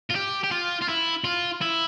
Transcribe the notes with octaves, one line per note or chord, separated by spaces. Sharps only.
F4
G4
G4
F4
F4
E4
F4
E4